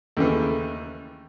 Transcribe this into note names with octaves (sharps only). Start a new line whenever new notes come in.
D#2 C#3 E3 A3